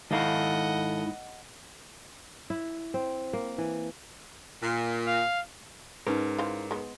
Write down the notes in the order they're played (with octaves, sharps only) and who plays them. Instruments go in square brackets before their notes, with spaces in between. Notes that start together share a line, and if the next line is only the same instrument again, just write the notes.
[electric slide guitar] G#2 E4 [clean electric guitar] D#3 A4 F5 [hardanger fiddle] D#5 F#5
[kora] E4
C4
A#3
E3
[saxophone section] A#2
[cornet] F5
[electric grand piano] G#2 [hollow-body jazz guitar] C#4 A#4 [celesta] D#4 B4
[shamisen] E3 C5 F5
G#3 B3